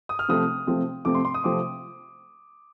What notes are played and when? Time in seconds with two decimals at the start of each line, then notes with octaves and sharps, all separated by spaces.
0.09 D#6
0.19 F6
0.29 C3 F3 A3 C4 D#6
0.67 C3 F3 A3 C4
1.05 C3 F3 A3 C4 D6
1.15 C6
1.25 C6
1.34 D#6
1.44 C3 F3 A3 C4 D6